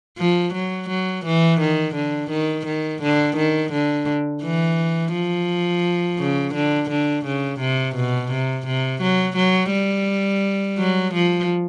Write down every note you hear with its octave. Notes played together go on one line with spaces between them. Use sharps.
F3
F#3
F#3
E3
D#3
D3
D#3
D#3
D3
D#3
D3
E3
F3
C#3
D3
D3
C#3
C3
B2
C3
C3
F#3
F#3
G3
F#3
F3